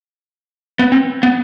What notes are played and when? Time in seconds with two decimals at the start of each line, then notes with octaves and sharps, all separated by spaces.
0.79 B3
0.92 C4
1.23 B3